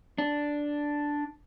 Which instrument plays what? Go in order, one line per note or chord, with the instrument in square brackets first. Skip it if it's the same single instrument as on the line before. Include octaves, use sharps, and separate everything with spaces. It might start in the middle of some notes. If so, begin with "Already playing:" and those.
[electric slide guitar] D4